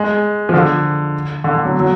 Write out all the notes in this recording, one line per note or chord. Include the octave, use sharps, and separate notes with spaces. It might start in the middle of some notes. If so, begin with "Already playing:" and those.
Already playing: G#3
F3
D3
D3
D3
F#3
F#3